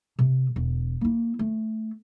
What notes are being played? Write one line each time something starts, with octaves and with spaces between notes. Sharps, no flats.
C3
E1
A#3 E4
A3